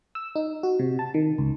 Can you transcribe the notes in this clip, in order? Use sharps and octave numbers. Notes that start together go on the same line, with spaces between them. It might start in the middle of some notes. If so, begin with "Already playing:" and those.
E6
D#4
F#4
C3
A5
D#3
C#2